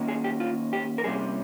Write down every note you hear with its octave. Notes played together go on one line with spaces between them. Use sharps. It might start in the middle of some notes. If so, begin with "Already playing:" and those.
Already playing: D#3 A#3 C#4
G#4
G4
F4
G4
A#4
C3 G3 A#3 C#4 G#4